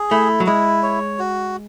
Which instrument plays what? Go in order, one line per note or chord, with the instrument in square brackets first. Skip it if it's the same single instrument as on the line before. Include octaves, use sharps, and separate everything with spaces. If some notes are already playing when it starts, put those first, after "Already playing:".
Already playing: [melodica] G#4
[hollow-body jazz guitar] A3 [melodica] E4
[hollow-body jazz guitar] F#3
[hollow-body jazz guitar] G#3 [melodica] E4
[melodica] C#5
F#4